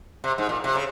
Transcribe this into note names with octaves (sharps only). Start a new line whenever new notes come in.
C3
G#2
A#2
C3
C#3